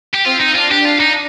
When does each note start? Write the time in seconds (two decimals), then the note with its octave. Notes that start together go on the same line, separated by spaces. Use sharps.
0.14 G4
0.26 C4 F4
0.41 D#4
0.55 D4 F4
0.71 G4
0.85 F4
1.00 D#4